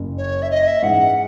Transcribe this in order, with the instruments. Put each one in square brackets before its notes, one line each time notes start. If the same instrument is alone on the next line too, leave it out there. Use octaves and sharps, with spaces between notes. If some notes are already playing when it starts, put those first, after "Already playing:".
Already playing: [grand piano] F#1 F#2 C#3
[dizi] C#5
E5
D#5
E5
[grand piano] G#2 E3 G#3 C#4 [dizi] F#5